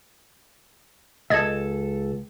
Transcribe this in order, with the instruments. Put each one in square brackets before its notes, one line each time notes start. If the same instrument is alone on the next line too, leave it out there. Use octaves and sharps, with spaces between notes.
[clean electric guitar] C#2 A4 [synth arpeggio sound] D#5 G#6